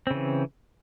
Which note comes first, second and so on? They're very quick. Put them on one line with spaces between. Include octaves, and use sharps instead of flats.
C4 C#3 E3